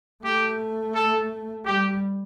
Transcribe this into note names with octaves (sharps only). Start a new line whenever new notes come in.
A3 G4
A4
G3 G4